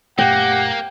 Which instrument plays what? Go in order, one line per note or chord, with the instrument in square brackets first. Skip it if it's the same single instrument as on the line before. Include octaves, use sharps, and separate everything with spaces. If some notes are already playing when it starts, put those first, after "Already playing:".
[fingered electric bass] F#2 A#2 A3 [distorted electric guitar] A#3 [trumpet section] G4 F#5 [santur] G5